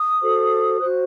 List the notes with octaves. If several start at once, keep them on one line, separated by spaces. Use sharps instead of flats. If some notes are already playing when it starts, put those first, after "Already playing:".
Already playing: D#6
F#4 A4 C5
F#4 C5 F#6